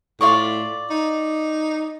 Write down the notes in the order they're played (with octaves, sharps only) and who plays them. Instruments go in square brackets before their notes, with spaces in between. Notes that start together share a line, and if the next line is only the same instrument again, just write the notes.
[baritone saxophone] A2 [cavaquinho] F4 D5 C#6
[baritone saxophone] D#4